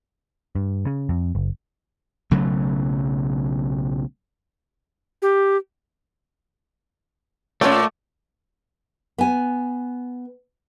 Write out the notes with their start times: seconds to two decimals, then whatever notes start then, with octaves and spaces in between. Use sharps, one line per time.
0.55 G2
0.87 C#3
1.09 F2
1.35 F#1
2.31 B1 C#3 F#3 A3
5.22 G4
7.61 A#2 A3 C#4 F4 D5 G5
9.18 B3 G#5